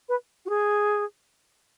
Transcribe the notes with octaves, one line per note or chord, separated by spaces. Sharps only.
B4
F#4
G#4